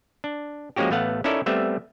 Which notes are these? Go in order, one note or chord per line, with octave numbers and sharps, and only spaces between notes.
D4
F3 G#3 A#3 C#4 F#4 G4
A1 A3 B3 F5 F#5
C#4 D#4 E4 A4 A#4 D5
G3 A3 B3 C4 E5